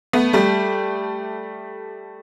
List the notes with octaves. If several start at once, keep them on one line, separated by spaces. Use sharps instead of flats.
A3 B3
G3 A3